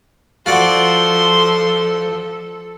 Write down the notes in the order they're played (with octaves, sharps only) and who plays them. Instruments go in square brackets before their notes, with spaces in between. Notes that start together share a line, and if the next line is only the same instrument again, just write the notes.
[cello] F3 [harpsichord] F4 F#4 D5 [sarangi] A4 [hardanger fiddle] C5 C6